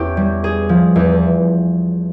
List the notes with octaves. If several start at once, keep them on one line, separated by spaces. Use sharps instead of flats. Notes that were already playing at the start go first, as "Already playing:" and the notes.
Already playing: E2 C#4 G4
G3
G#4
F3
E2